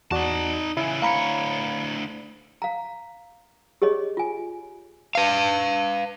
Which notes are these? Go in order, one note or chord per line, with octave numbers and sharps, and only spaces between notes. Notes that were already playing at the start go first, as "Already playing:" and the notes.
E2 D#4 F#4 D5 A5
C#3 E3 E4 G#5
D2 C#5 F5 A#5 B5
F5 A#5
G4 G#4 C#5 D#5
F4 G#5
B4 F5